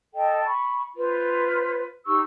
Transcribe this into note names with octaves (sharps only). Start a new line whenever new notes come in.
A4 D#5 G5
B5 C#6
F4 B4 C5
D#4 G4 C#6 E6